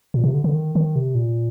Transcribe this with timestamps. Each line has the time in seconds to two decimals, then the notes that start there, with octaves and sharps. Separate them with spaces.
0.14 A#2
0.24 C3
0.34 D3
0.44 D3
0.54 D#3
0.75 D#3
0.96 C3
1.15 A#2